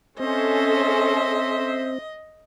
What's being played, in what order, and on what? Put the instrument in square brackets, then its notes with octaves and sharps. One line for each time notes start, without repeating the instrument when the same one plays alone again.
[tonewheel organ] C4 [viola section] C#4 A4 [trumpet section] C5 E5 [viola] D#5